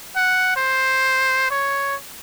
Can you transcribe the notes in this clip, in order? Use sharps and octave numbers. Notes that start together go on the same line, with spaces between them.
F#5
C5
C#5